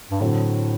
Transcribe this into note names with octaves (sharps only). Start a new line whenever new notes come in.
G2
A2 D3 F#3 C4